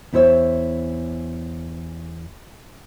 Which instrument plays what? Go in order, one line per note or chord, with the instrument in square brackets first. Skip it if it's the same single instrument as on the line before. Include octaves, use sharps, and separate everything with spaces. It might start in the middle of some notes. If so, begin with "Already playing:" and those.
[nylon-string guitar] E2 E4 C5 C#5 E5